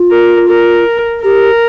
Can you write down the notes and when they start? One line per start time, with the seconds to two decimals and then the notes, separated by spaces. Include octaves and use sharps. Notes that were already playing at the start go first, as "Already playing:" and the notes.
Already playing: F4
0.11 A#4
0.49 A#4
1.24 G4 A#4